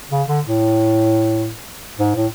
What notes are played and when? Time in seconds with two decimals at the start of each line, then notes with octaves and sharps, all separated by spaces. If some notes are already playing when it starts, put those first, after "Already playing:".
0.11 C#3
0.28 D3
0.45 A2
1.99 G#2
2.15 A2